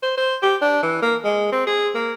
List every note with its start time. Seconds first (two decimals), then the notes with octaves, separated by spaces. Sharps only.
0.03 C5
0.17 C5
0.42 G4
0.62 D4
0.83 E3
1.02 A#3
1.24 G#3
1.52 C4
1.67 G#4
1.95 A#3